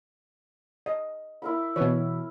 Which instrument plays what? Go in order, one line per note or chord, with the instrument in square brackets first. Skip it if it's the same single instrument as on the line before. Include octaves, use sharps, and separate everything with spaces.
[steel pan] D#5
[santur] E4 A#4 B5
[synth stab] B2 E3 [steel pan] C#5